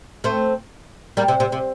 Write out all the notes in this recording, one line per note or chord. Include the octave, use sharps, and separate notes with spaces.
A3 C4
G3 A#3
C3
C3
C3